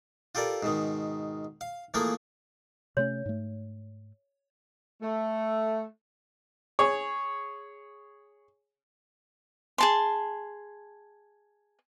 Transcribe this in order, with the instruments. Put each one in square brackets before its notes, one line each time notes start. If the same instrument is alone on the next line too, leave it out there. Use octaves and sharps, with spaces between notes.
[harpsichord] F4 G4 A4 A#4 D5
G#2 B2 D#3
F5
E3 F3 A3 A#3 G#4 A#4
[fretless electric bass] C3 A3 C#4 [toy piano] C#5
[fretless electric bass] G#2 A3
[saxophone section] A3
[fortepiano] G#4 C#5
[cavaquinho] G#4 A5 C6